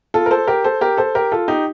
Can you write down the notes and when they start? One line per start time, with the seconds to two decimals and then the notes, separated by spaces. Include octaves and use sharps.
0.14 F4 A4
0.26 A#4
0.31 A4 C5
0.47 G4 A#4
0.64 A4 C5
0.81 G4 A#4
0.97 A4 C5
1.15 G4 A#4
1.32 F4 A4
1.48 D#4 G4